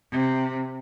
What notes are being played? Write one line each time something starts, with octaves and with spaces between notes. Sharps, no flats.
C3